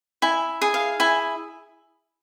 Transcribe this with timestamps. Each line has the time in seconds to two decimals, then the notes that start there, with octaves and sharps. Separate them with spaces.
0.22 E4 G#5
0.62 G#4
0.74 F5
1.00 E4 G#5